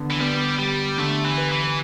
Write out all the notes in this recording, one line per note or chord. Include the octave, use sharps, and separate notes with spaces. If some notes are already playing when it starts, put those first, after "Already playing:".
Already playing: D3 B3
E3
G3 B3
G3 G4
D3 A3
E3
B4
E3